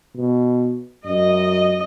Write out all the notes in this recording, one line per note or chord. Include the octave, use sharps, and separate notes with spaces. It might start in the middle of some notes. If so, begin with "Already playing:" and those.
B2
F#2 D#5